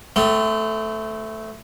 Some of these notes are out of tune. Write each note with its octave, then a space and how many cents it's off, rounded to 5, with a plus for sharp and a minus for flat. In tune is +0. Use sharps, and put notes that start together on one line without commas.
A3 +0 C4 -40